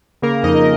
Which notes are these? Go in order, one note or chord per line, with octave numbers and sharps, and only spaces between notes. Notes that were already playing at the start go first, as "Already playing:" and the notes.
C#3 A#3 A#4
F2 D#4 D#5